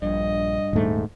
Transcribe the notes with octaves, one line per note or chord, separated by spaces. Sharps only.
A#1 G2 D#5
D#1 G#2 A3